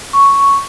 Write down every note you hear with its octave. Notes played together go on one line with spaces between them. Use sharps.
C#6